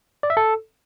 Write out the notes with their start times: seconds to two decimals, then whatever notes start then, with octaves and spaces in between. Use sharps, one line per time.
0.23 D5
0.30 E5
0.37 A4